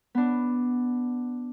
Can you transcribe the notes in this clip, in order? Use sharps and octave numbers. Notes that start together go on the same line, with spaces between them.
B3 D4